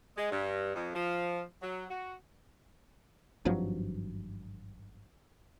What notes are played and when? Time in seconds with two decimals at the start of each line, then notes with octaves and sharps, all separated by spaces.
0.16 G#3
0.31 G2
0.74 F2
0.94 F3
1.62 F#3
1.90 F#4
3.45 G#1 G2 F3 F#3